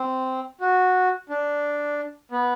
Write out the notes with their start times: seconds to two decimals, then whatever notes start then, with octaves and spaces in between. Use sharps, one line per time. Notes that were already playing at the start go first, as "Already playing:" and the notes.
Already playing: C4
0.61 F#4
1.29 D4
2.32 B3